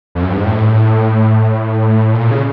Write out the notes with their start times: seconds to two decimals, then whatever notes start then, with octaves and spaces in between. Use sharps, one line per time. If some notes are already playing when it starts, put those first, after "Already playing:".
0.15 F2
0.22 F#2
0.30 G2
0.37 G#2
0.45 A2
2.14 A#2
2.31 C#3